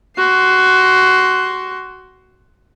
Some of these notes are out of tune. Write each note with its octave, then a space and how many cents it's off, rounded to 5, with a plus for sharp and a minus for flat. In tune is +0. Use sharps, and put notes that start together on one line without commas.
F#4 +15 C6 +0